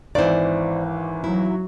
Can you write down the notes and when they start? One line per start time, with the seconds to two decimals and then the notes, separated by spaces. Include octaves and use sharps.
0.15 G#1 E3 C5 D5
1.24 F#3 E4